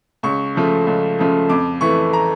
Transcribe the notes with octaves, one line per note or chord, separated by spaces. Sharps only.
C#2 C#6
C#3 F3 A3
C#2
C#3 F3 A3
F2 D6
E3 A3 C#6
A#5